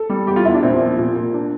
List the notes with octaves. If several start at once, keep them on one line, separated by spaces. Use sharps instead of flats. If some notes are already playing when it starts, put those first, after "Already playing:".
Already playing: A4
G3
E2 G4
F4
E2 E4
D4
A#2 C4
F3
A#2
A#2
D4